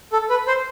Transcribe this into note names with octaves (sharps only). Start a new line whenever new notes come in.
A4
B4
C5